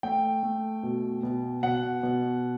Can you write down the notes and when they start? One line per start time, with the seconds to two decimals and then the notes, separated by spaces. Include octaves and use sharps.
0.03 A3 G5
0.43 A3
0.83 B2
1.23 B2
1.63 B2 F#5
2.03 B2